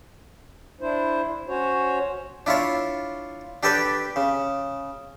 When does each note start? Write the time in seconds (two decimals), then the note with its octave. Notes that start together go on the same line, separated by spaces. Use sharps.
0.81 D4 E4 C5
1.48 C#4 F#4 C5 C#5
2.46 D4 E4 F4 C#5
3.63 D4 G4 A4 B4 D5 G5
4.16 C#3